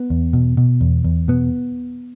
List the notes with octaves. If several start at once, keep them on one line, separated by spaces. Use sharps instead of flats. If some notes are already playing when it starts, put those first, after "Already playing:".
Already playing: B3
E2
B2
B2
E2
E2
B2 B3